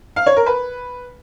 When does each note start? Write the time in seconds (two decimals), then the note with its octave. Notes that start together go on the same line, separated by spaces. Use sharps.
0.16 F5
0.26 C#5
0.36 A#4
0.46 B4